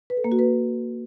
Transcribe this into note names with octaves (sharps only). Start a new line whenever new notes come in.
B4
A4
A#3
F#4
B4